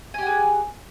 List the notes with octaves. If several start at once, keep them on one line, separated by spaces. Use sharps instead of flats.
G4 G#4 F#5 G#5